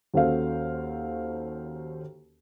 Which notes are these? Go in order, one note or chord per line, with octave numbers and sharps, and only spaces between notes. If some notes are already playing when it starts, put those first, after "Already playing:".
D#2 C#4 F#4 A4 C5 F5